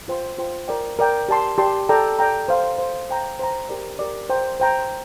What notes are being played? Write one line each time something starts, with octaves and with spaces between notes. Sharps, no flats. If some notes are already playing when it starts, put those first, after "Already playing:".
F4 C5 G5 C6
F4 C5 G5 C6
A#4 D5 G5
A#4 D5 G5
G4 D5 A5 C6
G4 D5 A5 C6
A4 D5 G5 A#5
A4 D5 G5 A#5
C5 F5 C6
C5 F5 C6
C5 G5 A#5
C5 G5 A#5
G4 A#4 D5
G4 A#4 D5
C5 G5 A#5
C5 G5 A#5